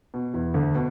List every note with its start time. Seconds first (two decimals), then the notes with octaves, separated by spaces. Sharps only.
0.14 B2
0.34 E2 E3
0.54 D2 D3
0.75 B2